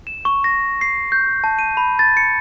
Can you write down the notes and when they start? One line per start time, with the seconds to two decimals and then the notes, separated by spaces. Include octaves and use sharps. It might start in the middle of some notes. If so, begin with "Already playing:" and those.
0.07 E7
0.25 C#6
0.44 A#6
0.81 C7
1.12 G6
1.44 A5
1.59 D#7
1.77 B5
1.99 A6
2.17 C#7